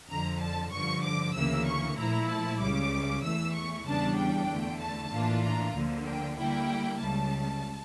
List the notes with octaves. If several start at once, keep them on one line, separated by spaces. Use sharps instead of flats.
F2 D3 F3 A#5
A5
G2 D3 F3 C#6
D6
D2 C#3 E3 A#3 E6
C#6
A#2 F3 A3 E4 A#5
A5
C#2 C#3 G3 D6
E2 E3 A3 E6
C#6
E2 C#3 G3 D4 A5
G5
E2 D3 A3
A5
A2 E3 A#3 D4 F4
A#5
D2 D3 F3 A#3
G5
D3 G3 A#3 E4 G5
C#2 C#3 G3 A5